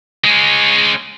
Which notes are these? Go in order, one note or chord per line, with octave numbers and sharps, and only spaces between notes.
G#3 C#4